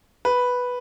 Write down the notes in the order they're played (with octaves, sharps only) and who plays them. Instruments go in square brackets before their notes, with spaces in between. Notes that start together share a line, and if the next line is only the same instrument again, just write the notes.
[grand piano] B4